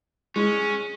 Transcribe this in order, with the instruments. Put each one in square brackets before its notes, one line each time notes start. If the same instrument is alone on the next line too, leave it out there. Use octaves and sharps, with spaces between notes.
[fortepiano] G#3 [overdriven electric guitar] C#4